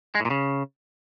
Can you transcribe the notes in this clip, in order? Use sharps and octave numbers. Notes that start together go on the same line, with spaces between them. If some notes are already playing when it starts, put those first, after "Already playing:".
G#3
A2
A#2
C#3